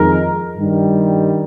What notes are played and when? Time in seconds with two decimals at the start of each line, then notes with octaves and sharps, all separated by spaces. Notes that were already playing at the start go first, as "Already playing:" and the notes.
Already playing: F2 D#3 G#3 D#4 A#4
0.56 G2 D#3 G3